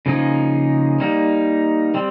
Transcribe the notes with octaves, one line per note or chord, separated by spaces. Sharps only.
C#3 F3 A#3 D#4 G#4
G3 A#3 D#4
G3 C4